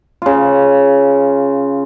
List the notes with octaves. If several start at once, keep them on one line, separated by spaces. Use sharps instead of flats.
C#3 F4